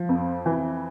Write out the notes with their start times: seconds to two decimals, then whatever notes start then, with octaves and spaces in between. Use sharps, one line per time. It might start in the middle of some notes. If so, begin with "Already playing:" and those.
Already playing: F3
0.09 F2
0.46 E3